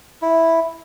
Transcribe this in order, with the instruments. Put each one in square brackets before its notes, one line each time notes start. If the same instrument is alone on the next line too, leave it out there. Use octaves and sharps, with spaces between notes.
[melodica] E4